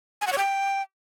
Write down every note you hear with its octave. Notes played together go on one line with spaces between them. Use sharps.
G#5
F#5
C#5
G5